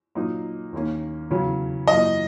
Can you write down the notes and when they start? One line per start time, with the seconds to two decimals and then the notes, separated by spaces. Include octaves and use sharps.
0.15 A#2 F#3 A#3 D#4
0.73 D#2 D#3 A#3 C#4
1.30 E2 C#3 F#3 C#4
1.87 F#2 E3 A#3 D#5